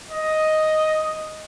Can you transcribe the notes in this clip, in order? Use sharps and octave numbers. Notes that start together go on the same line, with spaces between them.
D#5